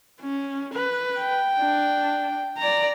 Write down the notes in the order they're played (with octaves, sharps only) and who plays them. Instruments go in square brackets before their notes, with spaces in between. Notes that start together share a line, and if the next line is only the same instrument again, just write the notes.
[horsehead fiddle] C#4
B4
[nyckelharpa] G5
[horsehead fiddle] D4
D5 A#5